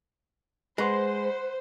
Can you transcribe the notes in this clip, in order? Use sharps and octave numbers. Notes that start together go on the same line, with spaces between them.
G#3 B4 C5 F#5 C6